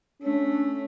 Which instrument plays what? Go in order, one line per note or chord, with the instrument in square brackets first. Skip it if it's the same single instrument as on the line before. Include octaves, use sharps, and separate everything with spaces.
[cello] A3 [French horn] C#4 [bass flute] D4